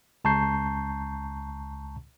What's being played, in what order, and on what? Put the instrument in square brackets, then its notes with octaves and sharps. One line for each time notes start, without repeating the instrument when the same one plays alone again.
[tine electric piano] C#2 A5 A#5 C#6 G6 C7